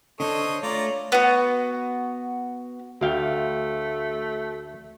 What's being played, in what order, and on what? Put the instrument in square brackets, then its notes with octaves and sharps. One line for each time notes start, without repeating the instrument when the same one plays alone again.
[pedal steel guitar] D3 D4 C5 [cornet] A4 [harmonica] C#5 D#5
[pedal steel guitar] A3 [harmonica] F4 D5 A#5 [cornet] C#5
[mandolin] B3 F#4
[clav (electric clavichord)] D2 F5 G5 [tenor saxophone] A3 [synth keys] F#4